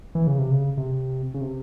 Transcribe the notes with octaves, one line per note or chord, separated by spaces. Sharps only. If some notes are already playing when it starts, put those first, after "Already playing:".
E3
C#3
C3
C#3
C3
C#3
C3